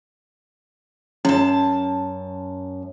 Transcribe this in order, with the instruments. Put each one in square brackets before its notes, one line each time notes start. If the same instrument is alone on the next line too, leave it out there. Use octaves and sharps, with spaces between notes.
[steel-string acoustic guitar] F#2 A5 [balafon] C#4